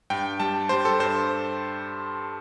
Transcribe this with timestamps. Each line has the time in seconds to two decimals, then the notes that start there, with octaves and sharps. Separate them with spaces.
0.10 G2 G5
0.40 G3 A5
0.69 G3 C5
0.85 A4
1.00 G2 C5